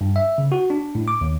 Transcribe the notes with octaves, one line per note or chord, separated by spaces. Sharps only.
G2
E5
C#3
F#4
D4
A2
D6
D#2